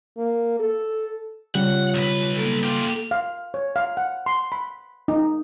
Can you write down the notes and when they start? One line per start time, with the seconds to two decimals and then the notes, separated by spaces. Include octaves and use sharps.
0.17 A#3
0.59 A4
1.55 C#3 G3 F4 C#5 F#5
1.95 B1 B4
2.36 A#3 A4
2.63 F4 G4
3.11 F5
3.54 C#5
3.76 F5
3.97 F#5
4.26 C6
4.52 B5
5.08 D#4